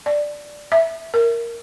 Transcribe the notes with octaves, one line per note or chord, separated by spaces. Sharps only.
D5
E5
A#4